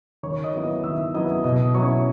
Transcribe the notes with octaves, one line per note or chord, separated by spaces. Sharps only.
D#3 C#5 C#6
D#5 D#6
F#3 B3 E4
D#5 D#6
D#3 E5 E6
F#3 B3 E4 D#5 D#6
B2 D#5 D#6
F#3 C#4 E4 C#5 C#6